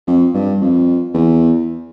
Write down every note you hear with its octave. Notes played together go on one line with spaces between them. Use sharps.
F2
G2
F2
E2